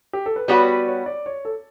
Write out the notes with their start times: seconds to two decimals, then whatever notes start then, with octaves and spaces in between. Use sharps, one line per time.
0.13 G4
0.26 A4
0.36 B4
0.48 G3 B3 F#4 B4 C#5
0.67 D5
0.87 C#5
1.06 D5
1.26 C#5
1.45 A4